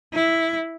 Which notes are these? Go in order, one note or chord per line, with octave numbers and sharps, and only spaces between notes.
E4